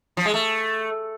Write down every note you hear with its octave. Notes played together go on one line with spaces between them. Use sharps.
F3
G#3
A3